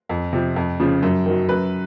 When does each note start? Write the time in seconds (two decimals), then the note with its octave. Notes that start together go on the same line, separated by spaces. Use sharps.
0.09 F2
0.33 C3 F3
0.56 F2
0.80 C#3 F3
1.03 F#2
1.26 D#3 F#3
1.49 F#2 B4